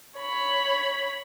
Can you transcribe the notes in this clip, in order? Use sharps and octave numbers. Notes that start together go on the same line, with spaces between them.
C#5 B5